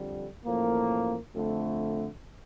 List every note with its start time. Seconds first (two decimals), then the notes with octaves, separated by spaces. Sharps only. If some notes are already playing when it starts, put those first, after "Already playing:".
Already playing: F2 D3 G3
0.45 A1 A2 F3 A#3
1.34 F2 D3 A3